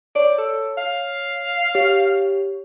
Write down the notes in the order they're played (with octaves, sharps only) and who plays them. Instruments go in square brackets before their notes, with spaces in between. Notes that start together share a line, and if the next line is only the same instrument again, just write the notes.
[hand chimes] C#5 [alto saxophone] D5
[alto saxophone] A4
F5
[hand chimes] G4 C#5